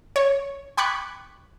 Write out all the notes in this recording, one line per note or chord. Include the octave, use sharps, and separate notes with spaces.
C#5
G5 B5 C#6 D6 F#6 G#6